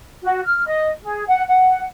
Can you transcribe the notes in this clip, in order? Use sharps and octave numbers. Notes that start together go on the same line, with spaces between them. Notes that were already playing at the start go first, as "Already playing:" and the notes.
F#4
F6
D#5
G#4
F#5
F#5